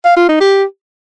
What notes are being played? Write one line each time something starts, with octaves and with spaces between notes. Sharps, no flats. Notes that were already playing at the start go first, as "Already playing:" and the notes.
F5
F4
D#4
G4